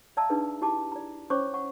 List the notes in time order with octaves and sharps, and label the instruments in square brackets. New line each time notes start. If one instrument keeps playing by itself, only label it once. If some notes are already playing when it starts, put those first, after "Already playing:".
[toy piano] D5 E5 F5 A5 A#5 E6
D4 D#4 G#4 B4
E4 G4 D#5 A5 D6
D5 A#5
C#4 C5 C#5 C#6 D6
F#5 C#6